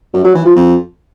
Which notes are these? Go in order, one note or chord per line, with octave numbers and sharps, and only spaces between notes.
F#2
F#3
E3
F3
F2